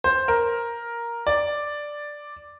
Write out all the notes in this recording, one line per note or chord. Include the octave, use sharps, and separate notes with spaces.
C5
A#4
D5